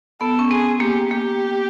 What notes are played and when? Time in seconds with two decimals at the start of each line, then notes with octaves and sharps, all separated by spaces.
0.21 B3 A4
0.39 C#4
0.50 C4 G#4
0.80 A#3 G4
1.11 A#3 G4